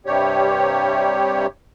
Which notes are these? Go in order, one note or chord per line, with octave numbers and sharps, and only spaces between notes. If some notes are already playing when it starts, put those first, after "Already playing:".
G2 C3 G3 G4 C#5